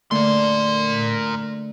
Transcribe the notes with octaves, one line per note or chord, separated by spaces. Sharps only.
D3 A3 A#3 A#4 C6